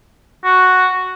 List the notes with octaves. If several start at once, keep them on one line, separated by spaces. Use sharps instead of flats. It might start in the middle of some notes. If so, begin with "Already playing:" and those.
F#4